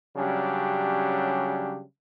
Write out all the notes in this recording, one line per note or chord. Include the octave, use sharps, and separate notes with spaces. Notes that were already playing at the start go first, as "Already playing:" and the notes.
C#3 F#3 G3 C#4 D4 G4